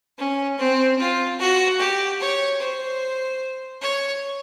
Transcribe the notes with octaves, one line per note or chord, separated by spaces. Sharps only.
C#4
C4
F4
F#4
G4
C#5
C5
C#5